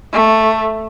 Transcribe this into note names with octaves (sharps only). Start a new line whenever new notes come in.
A3